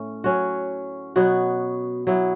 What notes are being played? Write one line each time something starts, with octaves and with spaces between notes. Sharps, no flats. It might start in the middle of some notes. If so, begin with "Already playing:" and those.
Already playing: A2 A3 C#4
F#3 C#4 F#4
B2 F#3 B3 F#4
F#3 B3 E4